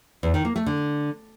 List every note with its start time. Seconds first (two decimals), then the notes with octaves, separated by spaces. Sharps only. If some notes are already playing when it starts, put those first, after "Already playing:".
0.23 E2
0.34 D#3
0.45 A#3
0.56 A3
0.66 D3